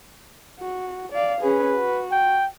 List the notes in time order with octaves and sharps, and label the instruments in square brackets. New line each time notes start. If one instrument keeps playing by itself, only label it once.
[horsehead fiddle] F#4
D5 F5
[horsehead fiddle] C#4 G#4 [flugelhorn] B4
[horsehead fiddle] F#4
[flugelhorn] G5